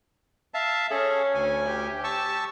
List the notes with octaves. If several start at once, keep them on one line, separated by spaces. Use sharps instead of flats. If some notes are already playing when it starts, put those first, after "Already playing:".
E5 F5 A5
C#4 G#4 A4
D2 G#5
G4
A5 C#6 E6